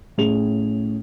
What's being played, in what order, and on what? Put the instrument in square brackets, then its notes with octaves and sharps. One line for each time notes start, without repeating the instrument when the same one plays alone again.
[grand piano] A2 C#4 G#4 F7